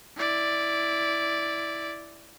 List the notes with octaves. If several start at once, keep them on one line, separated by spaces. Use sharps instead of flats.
E4 D5